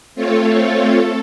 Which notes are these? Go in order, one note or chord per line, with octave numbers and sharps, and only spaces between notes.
A3 C4 F4 A4 C#5
A4